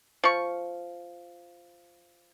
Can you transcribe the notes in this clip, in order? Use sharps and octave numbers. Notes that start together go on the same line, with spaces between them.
F3 C#6